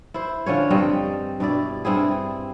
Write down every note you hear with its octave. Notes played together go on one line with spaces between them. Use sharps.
E4 C5
D3 F3 C#4 C#5
G2 G3 C4 D#5
G2 B2 E4 D5
G2 C4 E4 G#4